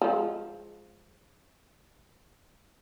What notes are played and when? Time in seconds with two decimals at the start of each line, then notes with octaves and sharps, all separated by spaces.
0.01 F3 G#3